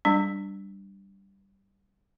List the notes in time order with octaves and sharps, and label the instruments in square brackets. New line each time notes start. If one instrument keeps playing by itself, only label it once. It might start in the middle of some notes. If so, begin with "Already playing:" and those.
[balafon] G3 D4